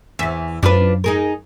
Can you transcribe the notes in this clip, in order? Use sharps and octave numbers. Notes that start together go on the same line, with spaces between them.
E2 E3 E5
F#2 D4 F4 B4
D#4 G#4 A#4